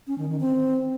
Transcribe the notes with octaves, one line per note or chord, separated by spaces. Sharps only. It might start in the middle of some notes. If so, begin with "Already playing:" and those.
C#4
D#3
D#3
C4